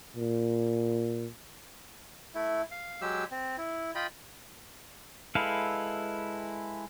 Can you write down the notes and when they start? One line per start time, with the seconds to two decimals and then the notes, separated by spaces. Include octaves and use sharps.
0.16 A#2
2.35 A3 E4
2.71 F5
3.01 F#3 G#3 G4 E6
3.31 C4
3.58 E4
3.95 F4 D#5 G5 B5
5.35 G#3 E4 A4 B4 F5